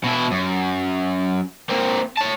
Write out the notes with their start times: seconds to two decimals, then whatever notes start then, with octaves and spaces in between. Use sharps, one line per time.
0.04 B2 E4
0.31 F#2
1.69 A#3 C4
2.17 C#5 A5